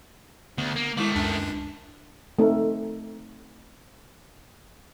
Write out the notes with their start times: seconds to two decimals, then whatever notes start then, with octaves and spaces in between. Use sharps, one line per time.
0.58 D2 B3
0.76 A#3
0.97 D#3 G#3 A3 E4 D6
1.15 C#2 F#2 D4
2.39 A3 C4 D#4 A4 A#4